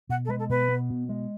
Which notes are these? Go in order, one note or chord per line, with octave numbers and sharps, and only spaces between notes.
B2 F#5
A4
G#3 B4
A4
B2 B4
B3
B2
G#3